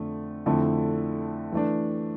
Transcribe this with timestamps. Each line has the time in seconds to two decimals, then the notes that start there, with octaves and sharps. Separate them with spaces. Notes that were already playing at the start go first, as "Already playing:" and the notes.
Already playing: F2 D3 A3
0.46 F2 D3 A3 E4
1.52 E3 A3 D4